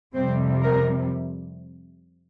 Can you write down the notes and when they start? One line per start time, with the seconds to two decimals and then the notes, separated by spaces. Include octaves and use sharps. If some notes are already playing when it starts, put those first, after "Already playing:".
0.14 F2 C3 G3 C4
0.62 A#4